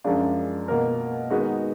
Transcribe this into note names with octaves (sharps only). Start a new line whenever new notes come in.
F#2 F3 G#3 D4 F4
B2 A#3 F4 A#4
D#3 G#3 B3 D#4 F#4